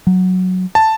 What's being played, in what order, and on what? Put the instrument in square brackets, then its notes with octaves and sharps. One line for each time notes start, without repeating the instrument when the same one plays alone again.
[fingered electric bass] F#3
[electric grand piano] A5